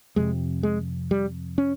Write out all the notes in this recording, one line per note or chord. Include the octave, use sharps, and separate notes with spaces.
F2 C3 G#3
G#3
G3
C#4